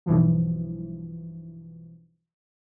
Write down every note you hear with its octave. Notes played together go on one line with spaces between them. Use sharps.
B1 G2 E3 F3